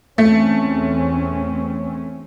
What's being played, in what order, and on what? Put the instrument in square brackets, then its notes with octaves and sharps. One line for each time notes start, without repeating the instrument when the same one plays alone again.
[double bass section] E2 C4 C#4 [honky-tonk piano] A3